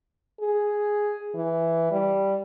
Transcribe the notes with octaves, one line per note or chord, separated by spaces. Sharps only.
G#4
E3
G3